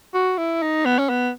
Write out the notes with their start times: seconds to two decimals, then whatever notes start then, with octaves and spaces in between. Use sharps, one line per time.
0.14 F#4
0.38 E4
0.62 D#4
0.86 B3
0.99 C#4
1.10 B3